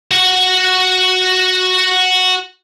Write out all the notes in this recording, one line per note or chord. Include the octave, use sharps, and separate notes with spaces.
F#4 F#5